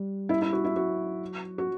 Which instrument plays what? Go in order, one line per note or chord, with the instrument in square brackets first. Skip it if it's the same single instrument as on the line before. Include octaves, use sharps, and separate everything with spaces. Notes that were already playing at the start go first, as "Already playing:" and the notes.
Already playing: [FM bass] G3
[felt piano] E4
E4
F#4
E4
[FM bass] F#3 [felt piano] F#4
[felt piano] F#4